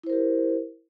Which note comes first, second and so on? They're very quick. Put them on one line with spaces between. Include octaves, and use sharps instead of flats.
E4 C5 A#4 G4